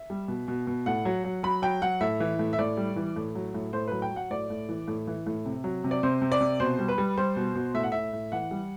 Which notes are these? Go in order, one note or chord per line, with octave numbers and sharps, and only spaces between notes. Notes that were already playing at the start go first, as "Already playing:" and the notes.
Already playing: E5
G3
B2
B2
B2
A2 F#5
F#3
F#3
F#3 B5
F#3 G5
F#3 F#5
A2 E5
E3
A2
E5
A2 D5
G3
E3
A2
F#3
A2
A2 C5
F#3 B4
G5
F#3
F#5
A2 D5
A2
E3
A2
E3
A2
C3
F#3
C3
D5
C3 C5
C3
D5
C3
B2 C5
G3
B4
G3
G3 C5
B2
B2
A2 E5
F#5
A2 E5
A2
E3 F#5
G3